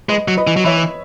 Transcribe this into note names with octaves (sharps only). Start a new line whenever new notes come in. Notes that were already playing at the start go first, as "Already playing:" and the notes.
G#3 B4 D#5
F#3
B4 D#5
E3
F#3
E3 C#5 E5